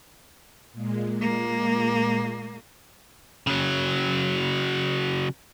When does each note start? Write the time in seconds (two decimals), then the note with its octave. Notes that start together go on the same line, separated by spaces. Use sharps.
0.72 A#2 G#3
1.21 A#3
3.47 C#3 F#3